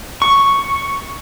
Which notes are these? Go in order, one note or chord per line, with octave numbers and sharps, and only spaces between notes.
C#6